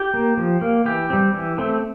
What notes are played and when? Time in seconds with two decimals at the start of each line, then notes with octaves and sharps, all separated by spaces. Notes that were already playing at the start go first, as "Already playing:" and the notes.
Already playing: G4
0.14 A#3
0.37 F3
0.61 A#3
0.86 E3 G4
1.10 G3 C4
1.33 E3
1.58 A3 C4